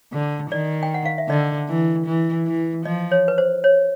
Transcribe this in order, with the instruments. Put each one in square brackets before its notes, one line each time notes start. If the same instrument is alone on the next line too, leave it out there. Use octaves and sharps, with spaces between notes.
[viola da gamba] D3
[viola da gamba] D#3 [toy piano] D5
[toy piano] G5
F#5
F5
E5
[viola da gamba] D3 [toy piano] D#5
[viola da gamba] E3
E3
E3
[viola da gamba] F3 [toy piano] D#5
[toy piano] C#5
B4
C5
C#5